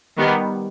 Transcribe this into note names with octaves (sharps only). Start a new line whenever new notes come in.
D#3 G3 B3